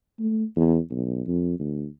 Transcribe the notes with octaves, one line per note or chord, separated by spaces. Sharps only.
A3
E2
B1
F2
D2